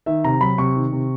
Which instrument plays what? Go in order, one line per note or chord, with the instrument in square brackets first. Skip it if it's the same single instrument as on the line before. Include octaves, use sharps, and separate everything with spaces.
[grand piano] D#3 E5
C3 A#5
F#3 B5
C3 C#6
D#3
C3